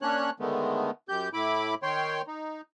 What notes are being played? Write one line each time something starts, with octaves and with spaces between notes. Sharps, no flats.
A#3 C#4 D4 C#5 F#6
D3 D#3 G#3 A3 B3
F#2 G4 G6
A2 E4 B5 D6
D#3 C#5 G5 C6
D#4